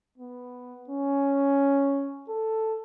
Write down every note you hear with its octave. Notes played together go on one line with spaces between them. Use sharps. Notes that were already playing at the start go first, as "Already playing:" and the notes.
B3
C#4
A4